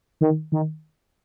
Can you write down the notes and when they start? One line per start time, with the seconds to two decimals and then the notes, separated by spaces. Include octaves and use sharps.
0.21 D#3
0.52 D#3